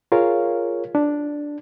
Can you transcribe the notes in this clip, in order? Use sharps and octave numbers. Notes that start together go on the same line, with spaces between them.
F4 G#4 A#4 C#5 F5
D4